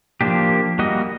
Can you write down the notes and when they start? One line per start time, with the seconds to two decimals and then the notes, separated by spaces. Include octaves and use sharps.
0.21 F3 A#3 D4 G4
0.79 G3 A#3 F#4 D#5